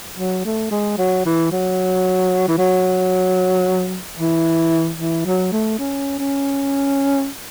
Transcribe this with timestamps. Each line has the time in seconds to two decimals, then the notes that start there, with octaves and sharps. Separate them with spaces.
0.18 F#3
0.45 A3
0.71 G#3
0.98 F#3
1.25 E3
1.52 F#3
2.48 E3
2.58 F#3
4.19 E3
4.98 E3
5.25 F#3
5.53 A3
5.79 C#4
6.19 C#4